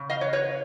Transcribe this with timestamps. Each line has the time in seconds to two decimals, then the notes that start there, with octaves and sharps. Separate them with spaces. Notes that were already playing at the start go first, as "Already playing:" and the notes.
Already playing: C#3
0.10 D#5 F5
0.21 B4 C#5
0.33 B4 C#5